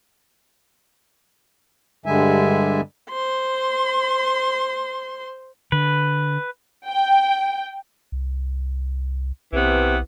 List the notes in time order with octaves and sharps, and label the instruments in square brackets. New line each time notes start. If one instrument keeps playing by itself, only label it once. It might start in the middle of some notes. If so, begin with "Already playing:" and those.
[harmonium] G2 D3 G3 G#3 E5 G#5
[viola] C5 C6
[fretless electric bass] D3 [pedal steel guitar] B4
[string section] G5
[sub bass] C2
[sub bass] B1 [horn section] C3 E3 B3